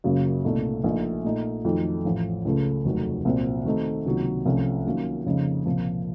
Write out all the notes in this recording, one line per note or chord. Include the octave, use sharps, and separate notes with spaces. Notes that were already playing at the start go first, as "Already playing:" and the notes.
F#2 C#3 F#3 A#3 F4
C2 A#2 A3 D#4
A#1 A#2 A3 D#4
A#2 A3 D#4
F2 D#3 F#3 A3 D#4
A1 A2 F3
C#2 C#3 A3
F1 D#2 D#3 F#3 A3
C2 A#2 F#3 C4
D#3 A3 C4 D#4 F#4
C#2 C3 D#3 F#3 A#3
C2 C3 F3 A3 C#4
D#3 F#3 A#3 C#4 F4
F2 C#3 F3 A#3 D#4
C2 A#2 F3 A#3